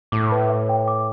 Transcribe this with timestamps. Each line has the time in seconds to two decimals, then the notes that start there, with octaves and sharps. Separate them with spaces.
0.12 A2 D6
0.32 B4
0.49 E5
0.69 G5
0.88 D6